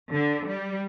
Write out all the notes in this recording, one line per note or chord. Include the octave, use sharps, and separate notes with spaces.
D3
G3